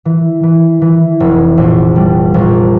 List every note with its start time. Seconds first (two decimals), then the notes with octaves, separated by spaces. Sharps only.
0.05 E3
0.43 E3
0.81 E3
1.20 F1
1.58 A#1
1.96 G3
2.34 A#1